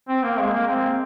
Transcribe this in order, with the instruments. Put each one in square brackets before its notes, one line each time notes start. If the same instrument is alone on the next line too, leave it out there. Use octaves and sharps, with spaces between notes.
[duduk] C4
A#3
G#3
A#3
C4